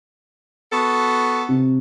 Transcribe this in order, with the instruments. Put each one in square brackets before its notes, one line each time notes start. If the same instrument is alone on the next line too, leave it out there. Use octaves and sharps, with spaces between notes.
[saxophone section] B3 F#4 A4
[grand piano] C3